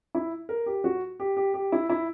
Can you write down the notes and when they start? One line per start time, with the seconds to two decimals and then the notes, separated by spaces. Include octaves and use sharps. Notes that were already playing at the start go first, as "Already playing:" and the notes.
0.15 E4
0.49 A#4
0.66 G4
0.84 F#4
1.20 G4
1.37 G4
1.54 G4
1.72 E4
1.89 E4